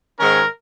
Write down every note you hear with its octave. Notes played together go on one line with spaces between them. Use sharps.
G#2 D#3 G#3 C#4 A#4